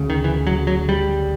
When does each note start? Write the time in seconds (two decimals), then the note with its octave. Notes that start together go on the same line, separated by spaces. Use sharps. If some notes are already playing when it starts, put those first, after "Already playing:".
Already playing: D2 C#3
0.10 D#3
0.24 E3
0.47 F#3
0.67 F#3
0.89 G3